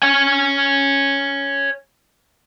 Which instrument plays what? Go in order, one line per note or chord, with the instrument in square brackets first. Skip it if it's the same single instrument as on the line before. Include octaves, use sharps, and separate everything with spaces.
[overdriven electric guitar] C#5 G#5